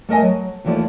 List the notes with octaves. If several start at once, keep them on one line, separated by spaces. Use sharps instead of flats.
A3 A#4 D#5 G#5
F#3
D#2 E3 F3 A3 D5